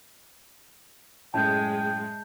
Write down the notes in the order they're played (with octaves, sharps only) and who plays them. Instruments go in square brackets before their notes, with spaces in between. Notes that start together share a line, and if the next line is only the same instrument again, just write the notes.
[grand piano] F#2 A2 [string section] G#3 [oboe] G5 [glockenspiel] A5 G6